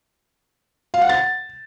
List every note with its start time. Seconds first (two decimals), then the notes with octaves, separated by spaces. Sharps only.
0.94 F5
1.02 F#5
1.09 A6